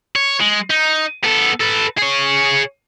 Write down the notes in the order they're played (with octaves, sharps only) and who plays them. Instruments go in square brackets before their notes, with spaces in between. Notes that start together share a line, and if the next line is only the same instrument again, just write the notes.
[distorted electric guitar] C#5
G#3
D#4
B3 A4
A4 B4
G#4 C#5